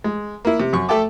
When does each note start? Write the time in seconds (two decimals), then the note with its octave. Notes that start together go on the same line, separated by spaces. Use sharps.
0.04 G#3
0.45 A#3 E4
0.60 C3
0.73 F#2 C#6
0.89 A3 A4 E5 G5 A5 D6